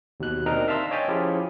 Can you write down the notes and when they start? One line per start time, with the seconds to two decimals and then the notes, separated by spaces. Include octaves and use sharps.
0.20 D#2 B2 F#6
0.46 C4 D4 D#4 A#4 D#5 A#5
0.68 E5 F5 A5 A#5 C6 E6
0.91 C#5 D#5 G5 G#5 A6 B6
1.08 F3 C#4 E4 F4 G4 G#4